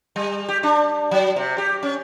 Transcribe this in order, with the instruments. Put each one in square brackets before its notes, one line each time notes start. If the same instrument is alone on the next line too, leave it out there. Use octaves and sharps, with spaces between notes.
[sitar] G3
G4
D4
F#3
C3
G4
C#4